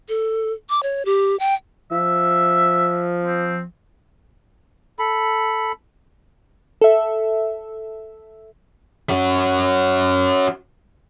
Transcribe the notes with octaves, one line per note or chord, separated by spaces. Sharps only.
A4
D6
C#5
G4
G5
F3 E5
C4
A4 B5
A4 E5
C#4 F#4